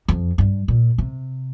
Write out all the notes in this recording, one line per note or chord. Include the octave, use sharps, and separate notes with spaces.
F2
G2
A#2
C3